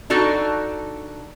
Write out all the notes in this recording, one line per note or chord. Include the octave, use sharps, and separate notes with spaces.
D4 D#4 F#4 A4